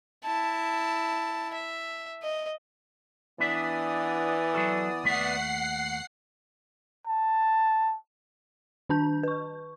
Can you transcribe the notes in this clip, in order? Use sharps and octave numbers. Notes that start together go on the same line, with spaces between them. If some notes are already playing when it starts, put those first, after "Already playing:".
E4 A5
E5
D#5
E3 B3 D4 E4 D5 E5 D#6
F#3 F#4 A4
D#2 A3 E5 F#5 C7
A5
D#3 D4 A5 G6
B4 C#6